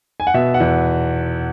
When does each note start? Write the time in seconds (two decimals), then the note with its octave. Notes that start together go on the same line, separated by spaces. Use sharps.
0.20 G#5
0.27 F#5
0.34 B2 E5
0.54 F#5
0.60 E2